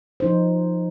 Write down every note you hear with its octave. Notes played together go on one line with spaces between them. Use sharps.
F3 D#4 C5